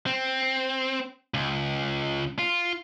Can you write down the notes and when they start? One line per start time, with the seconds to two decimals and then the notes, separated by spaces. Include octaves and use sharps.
0.06 C4
1.34 C#2
2.39 F4